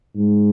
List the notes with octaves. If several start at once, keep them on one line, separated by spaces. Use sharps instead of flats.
G#2